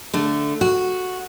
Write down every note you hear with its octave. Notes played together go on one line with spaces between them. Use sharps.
D3 A3
F#4